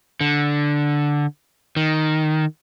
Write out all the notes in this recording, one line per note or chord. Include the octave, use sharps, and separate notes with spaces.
D3
D#3